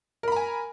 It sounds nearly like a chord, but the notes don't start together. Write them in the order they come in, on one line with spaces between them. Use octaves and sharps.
A#4 B5 A#5 G#5